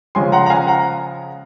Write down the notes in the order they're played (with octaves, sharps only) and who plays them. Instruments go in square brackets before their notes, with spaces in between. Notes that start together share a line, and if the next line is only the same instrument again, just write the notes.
[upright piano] C#3 F3 G#3 C#4 G#5 C6
F#5 A#5
A#5
F5 G#5
F#5 A#5